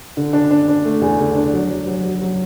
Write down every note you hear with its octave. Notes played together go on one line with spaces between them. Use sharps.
D3
D4
D4
D4
A3
E2
D3
D4
F#3
F#3
F#3
F#3
F#3